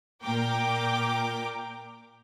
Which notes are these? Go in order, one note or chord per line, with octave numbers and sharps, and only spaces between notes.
A#2 A#4 G5 D6